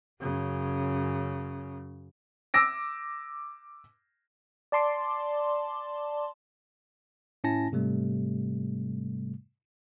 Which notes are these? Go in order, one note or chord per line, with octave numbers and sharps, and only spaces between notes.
F#2 C#3
D6 E6 A#6 D7
D5 A5 C6 D6
A2 C#4 E4 G#5 A5 A#6
G#2 C3 G3 A3